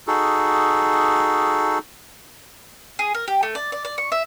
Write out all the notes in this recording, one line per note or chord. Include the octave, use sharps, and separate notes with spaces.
D#4 F#4 G#4 A4
G#4
A#4
G4
A3
D5
D5
D5
C#6
E5